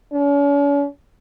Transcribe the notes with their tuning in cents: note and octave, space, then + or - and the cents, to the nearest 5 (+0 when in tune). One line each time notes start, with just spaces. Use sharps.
C#4 +45